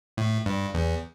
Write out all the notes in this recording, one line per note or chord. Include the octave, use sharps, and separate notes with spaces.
A2
G2
E2